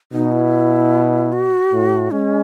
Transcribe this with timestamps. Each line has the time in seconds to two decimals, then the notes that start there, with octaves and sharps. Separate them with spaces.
0.12 B2 D#4
0.32 E4
1.32 F#4
1.72 A2
2.11 G#3 C#4